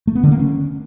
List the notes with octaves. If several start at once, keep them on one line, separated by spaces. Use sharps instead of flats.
A3
B3
D3
A#3
C#4